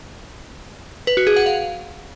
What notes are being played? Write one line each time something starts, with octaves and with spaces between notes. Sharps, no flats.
B4
F#4
G#4
F#5
F5